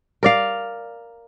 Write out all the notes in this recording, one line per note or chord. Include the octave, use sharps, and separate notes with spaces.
A#4 D5 F5